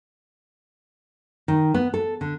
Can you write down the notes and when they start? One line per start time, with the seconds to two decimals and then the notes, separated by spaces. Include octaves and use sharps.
1.48 D#3
1.74 B3
1.94 A4
2.21 D3